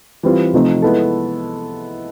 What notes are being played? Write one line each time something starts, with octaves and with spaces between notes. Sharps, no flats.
E3 G3 C4 F4
C3 F3 A3 C4 D#4
G#3 B3 E4 A4